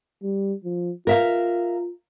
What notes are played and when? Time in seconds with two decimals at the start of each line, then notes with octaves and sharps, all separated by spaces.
0.23 G3
0.64 F3
1.07 F4 A#4 E5 F5